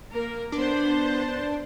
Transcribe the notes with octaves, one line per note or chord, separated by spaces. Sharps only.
A#3 A#4
B3 D4 C5